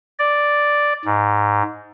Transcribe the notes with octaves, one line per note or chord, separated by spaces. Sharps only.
D5
G#2